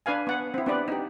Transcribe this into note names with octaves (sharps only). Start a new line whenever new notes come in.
D4 B4 F5 G#5
B3 F#5
C4 E4
B3 D4 G4 B4 D5
D#4 G4